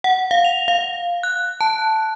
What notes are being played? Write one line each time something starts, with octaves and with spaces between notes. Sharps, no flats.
F#5
F5
F7
F5
F#6
A5